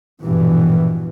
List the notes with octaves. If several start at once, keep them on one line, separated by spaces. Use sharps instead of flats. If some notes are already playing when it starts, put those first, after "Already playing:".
A#1 G2 B2 E3